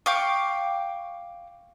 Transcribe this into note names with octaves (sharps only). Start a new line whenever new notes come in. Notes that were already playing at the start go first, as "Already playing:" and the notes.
F5 G5 C#6 D6